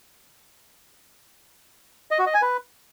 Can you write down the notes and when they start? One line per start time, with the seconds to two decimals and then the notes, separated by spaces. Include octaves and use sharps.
2.11 D#5
2.19 F#4
2.26 D#5
2.34 G#5
2.42 B4